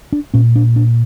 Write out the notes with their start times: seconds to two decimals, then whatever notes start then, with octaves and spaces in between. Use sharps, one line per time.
0.13 D4
0.34 A#2 C#4
0.56 D4
0.76 D4